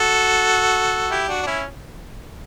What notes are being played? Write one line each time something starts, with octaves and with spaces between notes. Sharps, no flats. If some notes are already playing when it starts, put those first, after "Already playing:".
Already playing: F#4 A4
E4 G4
D4 F#4
D4
C#4 E4